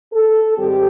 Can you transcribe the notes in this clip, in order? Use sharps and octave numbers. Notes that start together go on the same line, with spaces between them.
A4
G#2 D#3 G3 C4 G4